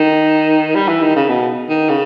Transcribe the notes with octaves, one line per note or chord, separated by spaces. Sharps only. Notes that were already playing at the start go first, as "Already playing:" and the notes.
Already playing: D#3
G3
E3
D#3
C#3
B2
D#3
C#3